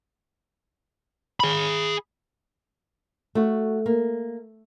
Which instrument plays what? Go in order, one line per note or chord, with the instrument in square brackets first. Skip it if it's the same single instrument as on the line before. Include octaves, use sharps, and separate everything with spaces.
[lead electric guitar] G#4 B5
[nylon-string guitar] A3 F#4
A#3